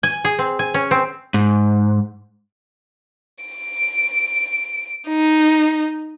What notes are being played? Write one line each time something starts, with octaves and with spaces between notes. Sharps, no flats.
G#5
G#4
C4
G#5
C#4
C4
G#2
D7
D#4